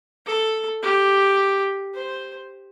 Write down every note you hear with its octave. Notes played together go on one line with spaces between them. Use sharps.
A4
G4
C5